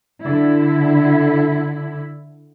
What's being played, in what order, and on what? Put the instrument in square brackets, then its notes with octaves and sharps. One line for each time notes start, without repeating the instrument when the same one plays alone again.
[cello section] D3 E4